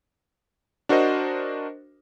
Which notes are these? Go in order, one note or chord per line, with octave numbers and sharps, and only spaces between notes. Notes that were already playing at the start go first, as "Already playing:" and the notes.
D4 F#4 A#4 C5 D#5